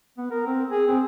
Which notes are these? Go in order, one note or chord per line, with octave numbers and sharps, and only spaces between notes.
B3
A#4
C4
G#4
C4